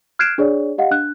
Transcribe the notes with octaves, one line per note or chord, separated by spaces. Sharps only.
F6 F#6 G#6 C7 D7 E7
D4 G#4 C#5 D5
G4 D#5 F5 F#5
D4 F#6